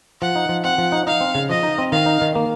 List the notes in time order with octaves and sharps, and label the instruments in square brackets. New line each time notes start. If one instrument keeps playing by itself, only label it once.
[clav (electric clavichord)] F3 [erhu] F#5
[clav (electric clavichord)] D#4
F3
[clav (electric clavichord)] C4 [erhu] F#5
[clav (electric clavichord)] F3
D#4
[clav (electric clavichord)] D#4 [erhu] F5
[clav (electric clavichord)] C4
C#3
[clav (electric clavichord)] F3 [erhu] D#5
[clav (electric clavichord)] D#4
C4
[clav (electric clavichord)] D#3 [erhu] F5
[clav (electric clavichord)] D#4
D#3
A#3